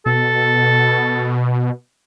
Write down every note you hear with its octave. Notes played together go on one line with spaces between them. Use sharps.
B2 A4